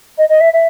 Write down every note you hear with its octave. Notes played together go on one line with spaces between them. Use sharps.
D#5
D#5
E5
E5